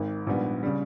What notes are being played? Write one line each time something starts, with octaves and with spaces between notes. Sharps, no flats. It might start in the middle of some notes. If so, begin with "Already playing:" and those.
Already playing: G#1 G#2 D#3
A#1 G#2 G3 B3
C#3 G3